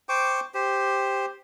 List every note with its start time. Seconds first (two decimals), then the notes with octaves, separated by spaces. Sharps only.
0.09 C5 G5 C#6 D6
0.54 G4 C5